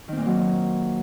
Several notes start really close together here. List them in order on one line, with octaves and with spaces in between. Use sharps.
D#3 C4 A#2 A#3 F#3